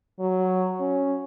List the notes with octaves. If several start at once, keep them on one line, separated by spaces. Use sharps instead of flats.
F#3
C#4